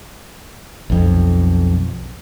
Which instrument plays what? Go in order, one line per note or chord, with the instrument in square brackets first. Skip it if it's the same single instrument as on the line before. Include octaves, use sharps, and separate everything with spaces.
[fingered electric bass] B1 F2